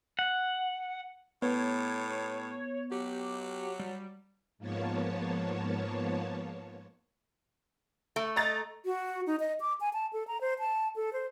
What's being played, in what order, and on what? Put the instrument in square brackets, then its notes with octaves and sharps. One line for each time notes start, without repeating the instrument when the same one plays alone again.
[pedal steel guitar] F#5
[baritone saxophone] A2 [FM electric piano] B3 [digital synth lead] C#5
[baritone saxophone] F#3 [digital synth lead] G4
[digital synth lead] G3
[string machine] G#2 F3 A#3 B3 C#5 A5
[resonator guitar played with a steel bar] A3
[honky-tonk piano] D#5 A#5 A6
[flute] F#4
D#4
D#5
D6
G#5
A5
A4
A#5
C5
A5
A4
C5